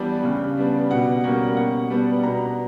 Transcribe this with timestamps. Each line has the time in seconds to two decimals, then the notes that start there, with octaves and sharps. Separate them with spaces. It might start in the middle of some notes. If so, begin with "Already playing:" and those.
Already playing: E3 G3 B3 D4 B4
0.24 C#3
0.57 G3 B3 D4
0.90 B2 F#5
1.24 G3 A#3 C#4 F#5
1.57 B2 F#5
1.90 G3 B3 D4
2.23 B2 A#5